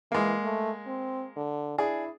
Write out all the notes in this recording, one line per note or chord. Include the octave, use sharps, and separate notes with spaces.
E3 G#3 A#3
A3
C4
D3
D4 E4 G#4